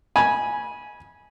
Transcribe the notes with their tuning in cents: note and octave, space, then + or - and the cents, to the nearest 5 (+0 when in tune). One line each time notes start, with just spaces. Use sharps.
G#5 +0 B5 -25